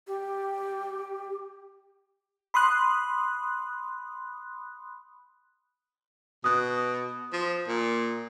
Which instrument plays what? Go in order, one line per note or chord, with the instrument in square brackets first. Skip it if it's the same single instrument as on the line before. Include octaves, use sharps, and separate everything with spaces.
[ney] G4
[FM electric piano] B5 C6 D#6 F#6
[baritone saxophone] B2 [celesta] D#6 F#6
[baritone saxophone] F3
A#2